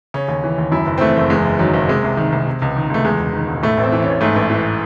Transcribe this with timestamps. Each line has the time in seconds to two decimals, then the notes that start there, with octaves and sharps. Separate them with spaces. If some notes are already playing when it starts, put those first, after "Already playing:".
0.14 C#3 C#4
0.28 D#2
0.44 E3
0.58 D#2
0.72 F#2 E4
0.86 F#1
0.98 C4
1.01 E3 A3
1.16 F#1
1.30 E2 G#3
1.45 F#1
1.59 D#3 F#3
1.73 F#1
1.88 C3 G#3
2.04 C2
2.17 D#3
2.32 C2
2.47 C3
2.62 C#2
2.76 D#3
2.90 C#2 A3
3.04 E2 G#3
3.20 E1
3.33 D#3
3.48 E1
3.63 A2 A3
3.77 A1
3.83 C4
3.92 E3
4.02 A1 C#4
4.21 G#2 A3
4.35 A1
4.50 E3